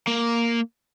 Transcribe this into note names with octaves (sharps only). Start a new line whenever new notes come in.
A#3